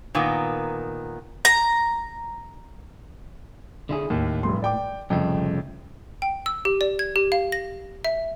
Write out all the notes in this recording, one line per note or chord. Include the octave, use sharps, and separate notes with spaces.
A#2 D#3 B3
A#5
D3 E4 G#4
D#2 A2
F1 G2 C6
D5 G5 D6
C2 F2 C#3 A3 G5
G5
E6
G4
D5
G#6
G4
F5
A#6
E5